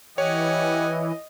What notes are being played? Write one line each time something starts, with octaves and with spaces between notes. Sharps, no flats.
E3 G4 C#5 D#5 F#5 G#5